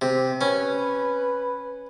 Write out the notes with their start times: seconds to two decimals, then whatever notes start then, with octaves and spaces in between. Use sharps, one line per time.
0.01 C3
0.41 C#4 B4